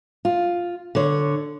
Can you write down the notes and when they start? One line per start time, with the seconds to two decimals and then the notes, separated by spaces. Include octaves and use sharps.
0.25 F4
0.95 D3 C#5